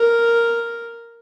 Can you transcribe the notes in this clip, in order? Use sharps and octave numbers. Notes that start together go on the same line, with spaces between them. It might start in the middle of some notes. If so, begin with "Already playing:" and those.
Already playing: A#4